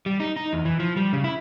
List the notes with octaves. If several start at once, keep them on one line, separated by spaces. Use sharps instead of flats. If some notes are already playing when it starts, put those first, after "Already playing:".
G3
D#4
D#4
E2
E3
F3
G3
C#3
E4